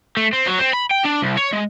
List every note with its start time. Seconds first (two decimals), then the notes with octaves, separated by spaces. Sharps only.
0.17 A3
0.33 C4
0.47 F#3
0.59 C4
0.73 B5
0.91 G5
1.04 D4
1.22 C2
1.37 C#5
1.53 G#3